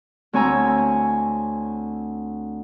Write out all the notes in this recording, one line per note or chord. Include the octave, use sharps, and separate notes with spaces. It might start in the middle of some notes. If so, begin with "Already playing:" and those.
D2 C4 C#5 G#5 A#5 E6